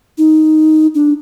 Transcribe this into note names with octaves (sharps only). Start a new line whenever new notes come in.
D#4
D4